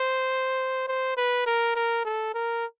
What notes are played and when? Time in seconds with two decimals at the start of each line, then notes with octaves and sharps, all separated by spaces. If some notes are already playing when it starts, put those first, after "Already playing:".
Already playing: C5
0.88 C5
1.17 B4
1.46 A#4
1.76 A#4
2.05 A4
2.34 A#4